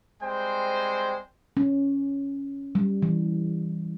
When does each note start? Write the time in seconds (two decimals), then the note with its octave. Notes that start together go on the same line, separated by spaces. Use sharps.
0.22 G3 G#3 C4 C5 G5 G#5
1.57 C#4
2.75 G3
3.02 E3